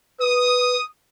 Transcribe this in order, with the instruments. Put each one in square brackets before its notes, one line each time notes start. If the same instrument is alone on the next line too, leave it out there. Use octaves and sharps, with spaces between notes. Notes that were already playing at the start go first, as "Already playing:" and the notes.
[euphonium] B4 [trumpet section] D#6